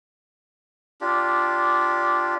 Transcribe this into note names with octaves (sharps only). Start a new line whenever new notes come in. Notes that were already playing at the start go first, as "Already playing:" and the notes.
D4 F4 G4